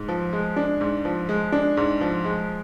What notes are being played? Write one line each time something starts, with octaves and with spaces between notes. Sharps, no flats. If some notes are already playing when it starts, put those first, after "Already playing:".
Already playing: G#2
F3
G#3
D4
G#2
F3
G#3
D4
G#2
F3
G#3